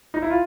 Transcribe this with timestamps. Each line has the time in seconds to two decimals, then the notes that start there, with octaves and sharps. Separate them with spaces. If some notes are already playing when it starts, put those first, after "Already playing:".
0.14 D#4
0.22 E4
0.30 F4